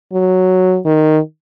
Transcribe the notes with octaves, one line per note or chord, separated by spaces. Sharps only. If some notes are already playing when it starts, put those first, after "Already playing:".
F#3
D#3